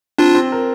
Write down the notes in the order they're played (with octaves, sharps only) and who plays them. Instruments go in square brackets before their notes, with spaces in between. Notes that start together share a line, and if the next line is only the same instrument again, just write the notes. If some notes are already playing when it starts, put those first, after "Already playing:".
[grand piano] C4 [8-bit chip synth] D4 F4
[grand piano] C4
A#4